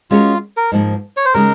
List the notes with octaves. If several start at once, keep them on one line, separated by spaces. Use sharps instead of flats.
G#3 C#4 F4 F#4 A#4 C#5
A#4
G#2 F3 A#3 D#4
C#5
C5
C#3 G#3 D#4 A#4